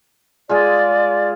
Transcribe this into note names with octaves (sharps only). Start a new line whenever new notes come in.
G#3 F4 G#4 D5